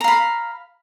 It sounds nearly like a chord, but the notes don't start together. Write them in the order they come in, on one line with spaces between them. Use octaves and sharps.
A#5 F5 B5